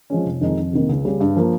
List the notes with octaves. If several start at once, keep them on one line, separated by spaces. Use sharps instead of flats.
F3 G#3 C#4
F1
F2 D#3 G#3 D#4
F2
C3 D#3 A#3
C#2
C#3 G3 C#4
G2
F3 A#3